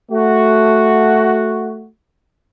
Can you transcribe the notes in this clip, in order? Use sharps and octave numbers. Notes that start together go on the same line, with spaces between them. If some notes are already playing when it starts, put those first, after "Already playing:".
A3 F#4